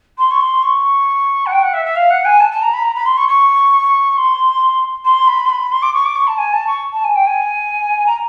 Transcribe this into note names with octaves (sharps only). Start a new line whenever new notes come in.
C6
C#6
C6
C#6
F#5
G5
F#5
E5
E5
F5
F#5
G#5
A5
A5
A#5
B5
A#5
B5
C6
C#6
C#6
C6
C6
B5
C6
B5
C6
D6
C#6
D6
C#6
A5
G#5
A5
C#6
A5
G#5
G5
G#5
A#5